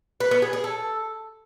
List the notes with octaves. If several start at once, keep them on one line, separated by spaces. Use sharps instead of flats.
B4
B3
G#4
G#4
A4